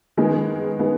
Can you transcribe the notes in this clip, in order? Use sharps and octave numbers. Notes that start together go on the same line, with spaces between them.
D#3 G#3 B3
D#3 G#3 B3